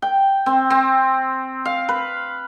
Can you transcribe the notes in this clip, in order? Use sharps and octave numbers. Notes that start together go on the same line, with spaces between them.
G5
C4
C4
F5
B4